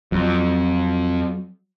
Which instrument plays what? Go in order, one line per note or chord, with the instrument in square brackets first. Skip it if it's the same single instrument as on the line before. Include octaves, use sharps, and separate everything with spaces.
[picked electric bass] F2 [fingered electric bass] F#3